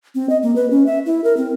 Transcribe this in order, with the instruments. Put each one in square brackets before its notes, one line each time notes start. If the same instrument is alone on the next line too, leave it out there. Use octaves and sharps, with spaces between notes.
[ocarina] C4
D#5
A#3
B4
C#4
E5
E4
A#4
C4